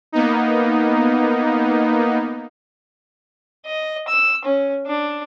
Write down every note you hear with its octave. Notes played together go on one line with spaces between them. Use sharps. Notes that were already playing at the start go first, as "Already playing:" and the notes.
A#3 B3 D#4
D#5
E6
C#4
D4